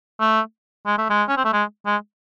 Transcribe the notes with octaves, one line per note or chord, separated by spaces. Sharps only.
A3
G#3
A3
G#3
C#4
C4
A3
G#3
G#3